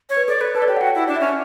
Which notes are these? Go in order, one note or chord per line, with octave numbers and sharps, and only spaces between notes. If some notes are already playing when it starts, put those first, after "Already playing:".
C#5
B4
A4 D5
A4 B4
A4 B4
D5
G4 C#5
F#5
F#4 G5
E4
D4 D5
E5
C#4 D5